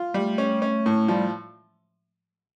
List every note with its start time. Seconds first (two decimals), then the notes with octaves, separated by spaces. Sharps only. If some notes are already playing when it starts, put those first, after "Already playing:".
Already playing: F4
0.14 G3 A3
0.38 C#4
0.62 C#4
0.86 A2
1.08 F3 G3